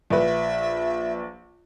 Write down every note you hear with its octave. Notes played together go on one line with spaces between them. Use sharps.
A#1 B4 E5